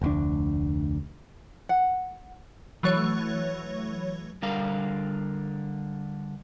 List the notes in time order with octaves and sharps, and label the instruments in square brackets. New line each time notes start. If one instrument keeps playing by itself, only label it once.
[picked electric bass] F1 D2 D4
[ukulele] F#5
[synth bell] E3 F#3 A3 C#5
[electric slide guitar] D3 G3 A#4 F5